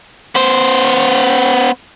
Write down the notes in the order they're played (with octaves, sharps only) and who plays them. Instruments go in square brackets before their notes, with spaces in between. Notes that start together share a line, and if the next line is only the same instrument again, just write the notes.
[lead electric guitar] B3 C5